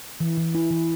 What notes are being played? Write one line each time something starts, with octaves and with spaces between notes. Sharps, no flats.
E3
E3
E4
E3